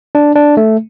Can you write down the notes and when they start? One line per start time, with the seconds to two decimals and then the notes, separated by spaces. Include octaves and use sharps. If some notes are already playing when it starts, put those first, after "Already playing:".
0.15 D4
0.35 D4
0.57 A3